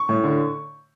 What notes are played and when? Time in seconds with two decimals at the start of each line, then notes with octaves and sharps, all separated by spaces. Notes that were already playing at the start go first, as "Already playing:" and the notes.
Already playing: C#6
0.09 A2
0.24 D3